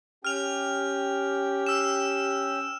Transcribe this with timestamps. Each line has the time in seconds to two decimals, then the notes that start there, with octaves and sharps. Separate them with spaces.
0.25 C#4 G4 G5 F6 F7
1.67 E6 E7